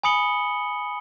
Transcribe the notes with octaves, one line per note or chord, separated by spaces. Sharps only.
G#5 B5 D#6 C#7 F#7 G7